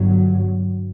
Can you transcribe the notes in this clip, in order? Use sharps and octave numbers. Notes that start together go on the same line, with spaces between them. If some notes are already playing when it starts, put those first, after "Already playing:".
Already playing: G1 G2 F#3